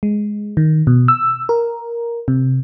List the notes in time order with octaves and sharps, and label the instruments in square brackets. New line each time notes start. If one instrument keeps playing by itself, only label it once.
[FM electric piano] G#3
D#3
B2
E6
A#4
C3